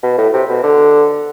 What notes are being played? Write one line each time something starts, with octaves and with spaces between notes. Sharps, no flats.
B2
A2
C3
B2
D3